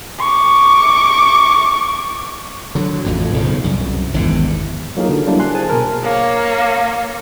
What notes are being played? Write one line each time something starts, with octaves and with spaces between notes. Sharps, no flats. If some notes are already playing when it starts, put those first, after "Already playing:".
C#6 D6
D3 F#3
A1 F2 A2
B1 C#3 F3
C2 F#2
G#1 E2 G2 D3
F#3 A#3 D#4 F4 G#4 A#4
D3
F#3 G3 A#3 D4 E4
G#5 C6 F#6
G#4 C5 G#5 A5
B2 A#4
A#3 C#5